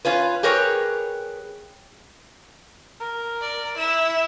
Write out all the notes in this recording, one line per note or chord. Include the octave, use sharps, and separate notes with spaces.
C#4 F4 B4
G4 G#4 A#4 B4 C#5
A#4
D5
E4 E5 E7